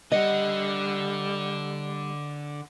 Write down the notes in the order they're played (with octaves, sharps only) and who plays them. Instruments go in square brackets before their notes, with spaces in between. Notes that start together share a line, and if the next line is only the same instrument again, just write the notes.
[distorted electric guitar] D3 F#5 [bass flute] G3 [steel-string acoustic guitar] D#5